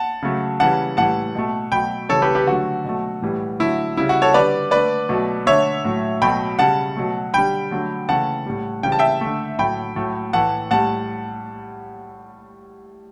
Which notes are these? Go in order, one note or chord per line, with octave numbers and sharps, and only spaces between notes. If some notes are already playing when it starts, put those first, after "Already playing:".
Already playing: F#5 A5
C#3 F#3 A3
C#3 E3 G3 F#5 A5
A2 E3 G3 F#5 A5
B2 A3
B2 F#3 A3 G5 B5
C#3 E3 G3 A4 C#5
G4 B4
G4 B4
D3 F#3 A3 F#4
B2 F#3 A3
A2 E3 G3
D3 F#3 A3 E4
C#3 G3 E4
F#4
A4 C#5
D3 G3 B4 D5
D3 A3 B4 D5
B2 F#3 A3
D3 A3 C#5 E5
A2 F#3 A3
B2 F#3 A3 G5 B5
C#3 G3 F#5 A5
B2 F#3 A3
D3 G3 G5 B5
D3 F#3 A3
C#3 E3 A3 F#5 A5
A2 G3
C#3 E3 G3 G5
A5
E5 G5
D3 A3
A2 F#3 A3 G5 B5
A2 F#3 A3
A2 E3 A3 F#5 A5
A2 G3 F#5 A5